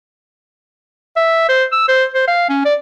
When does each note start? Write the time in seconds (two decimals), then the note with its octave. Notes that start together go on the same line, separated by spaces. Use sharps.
1.16 E5
1.49 C5
1.72 E6
1.88 C5
2.14 C5
2.27 F5
2.49 C#4
2.65 D5